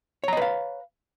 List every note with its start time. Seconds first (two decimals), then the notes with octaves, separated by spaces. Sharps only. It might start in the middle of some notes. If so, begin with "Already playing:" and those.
0.24 C#5
0.28 A#5
0.33 D#5
0.37 B4
0.42 F5